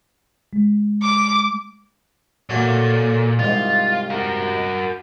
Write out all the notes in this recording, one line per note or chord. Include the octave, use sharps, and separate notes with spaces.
G#3
D6
A#2 F#3 A3 A#3
C2 G#2 F4
F#4 A#4